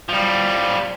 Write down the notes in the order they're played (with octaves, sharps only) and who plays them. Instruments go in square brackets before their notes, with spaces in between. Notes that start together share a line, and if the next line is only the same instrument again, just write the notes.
[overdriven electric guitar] F3 G3